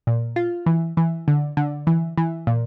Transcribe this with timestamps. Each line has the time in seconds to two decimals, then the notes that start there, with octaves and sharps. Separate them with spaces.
0.07 A#2
0.36 F4
0.66 E3
0.97 E3
1.28 D3
1.57 D3
1.87 E3
2.17 E3
2.47 A#2